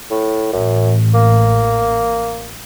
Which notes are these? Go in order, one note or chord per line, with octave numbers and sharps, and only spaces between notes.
A2
A1 F#2
A#3